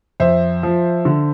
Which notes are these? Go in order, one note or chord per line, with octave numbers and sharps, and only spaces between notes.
F2 C5 E5
F3
D3